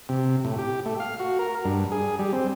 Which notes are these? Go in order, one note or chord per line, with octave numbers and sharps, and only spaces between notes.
C3
A2
G4
A3
F5
F#4
A#4
G2
G#4
G3
C4